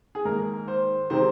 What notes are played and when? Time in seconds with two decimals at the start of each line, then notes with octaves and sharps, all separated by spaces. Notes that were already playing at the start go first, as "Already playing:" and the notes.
0.15 G#4
0.25 G#2 D#3 A#3 A#4
0.68 C5
1.10 C3 D#3 G#3 C4 C5